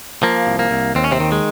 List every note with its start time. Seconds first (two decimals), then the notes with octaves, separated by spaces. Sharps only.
0.23 F3 A#3
0.47 C2
0.59 A#3
0.71 C2
0.95 D#2 C4
1.04 C#4
1.12 C3 C4
1.20 D#3
1.32 G#3